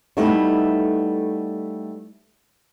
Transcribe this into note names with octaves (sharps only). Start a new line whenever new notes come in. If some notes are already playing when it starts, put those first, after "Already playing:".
G3 A3 B3 D#4 E4